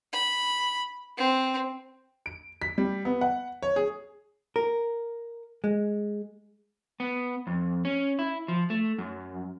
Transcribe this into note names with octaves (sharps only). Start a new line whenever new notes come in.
B5
C4
D7
B6
G3
B3
F#5
C#5
G#4
A#4
G#3
B3
F2
C#4
E4
F3
A3
F#2